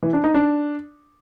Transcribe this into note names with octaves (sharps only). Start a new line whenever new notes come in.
E3
D4
D#4
D4